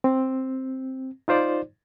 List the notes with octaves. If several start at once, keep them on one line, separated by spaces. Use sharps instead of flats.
C4
D#4 F4 C5 D5